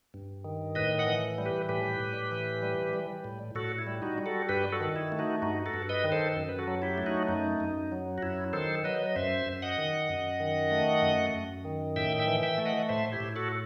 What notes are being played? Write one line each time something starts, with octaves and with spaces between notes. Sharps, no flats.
G2
D#3
A2 B4 D#5
D#5 F#5
E3
G3
G4 B4
A2 G4 B4
A2
E3
G3
G3
A2
A2 F#4 A4
E4
G3
D#4 F#4
G3
F#4 A4
G2 G4 B4
F#4 A4
D#3
E4
A3
D#4 F#4
G2 D#4 F#4
F#4 A4
G2
B4 D#5
D#3
A4 C5
F#2
B4
F#4 A4
F#3
E4 G4
A3
D#4 F#4
F#2 D#4
F#2
F#3
F#4
F#2 E4
D#3 A4 C5
F#3 B4 D#5
D#5
F#2 C5 E5
F#2
D#5 F#5
D#3
F#2
D#3
A3
F#2
F#2
D#3
A2 E5 G5
E5 G5
E3
E5 G5
A3
D#5 F#5
A2 C5 E5
E4 G4
A2
F#4 A4